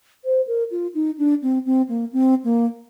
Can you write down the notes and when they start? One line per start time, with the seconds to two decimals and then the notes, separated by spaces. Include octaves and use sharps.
0.25 C5
0.47 A#4
0.71 F4
0.94 D#4
1.18 D4
1.42 C4
1.66 C4
1.89 A#3
2.13 C4
2.44 A#3